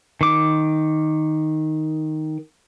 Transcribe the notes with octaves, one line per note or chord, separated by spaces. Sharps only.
D#3 D6